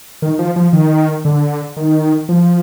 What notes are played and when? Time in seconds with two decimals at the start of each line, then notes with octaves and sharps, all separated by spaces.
0.22 D#3
0.39 F3
0.56 F3
0.73 D#3
1.25 D3
1.77 D#3
2.29 F3